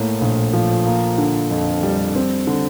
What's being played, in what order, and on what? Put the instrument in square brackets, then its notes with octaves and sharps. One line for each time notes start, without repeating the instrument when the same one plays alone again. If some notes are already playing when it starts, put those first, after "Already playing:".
Already playing: [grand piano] A2 A#3
A#1
F3
A#3
D3
F2
G3
C4
D3